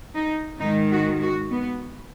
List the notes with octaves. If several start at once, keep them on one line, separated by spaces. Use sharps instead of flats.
D#4
G#2 D#3 G#3 D#4
F#4
F#4
B3